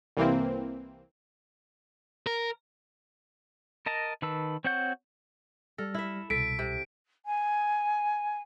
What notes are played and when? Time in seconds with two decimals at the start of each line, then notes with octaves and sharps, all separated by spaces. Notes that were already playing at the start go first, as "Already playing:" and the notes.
0.17 C2 E3 A#3 C4
2.27 A#4
3.86 A#4 D#5 A5 A#5
4.22 D#3 B4 A5 E6
4.64 C4 F#4 C#5 F#5 G6
5.78 G3 A4 F6 A#6
5.94 E4 E5
6.30 C2 B2 A4 B6 D7
6.59 C3
7.25 G#5